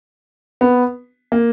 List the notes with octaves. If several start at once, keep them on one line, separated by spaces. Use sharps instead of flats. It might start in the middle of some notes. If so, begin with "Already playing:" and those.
B3
A#3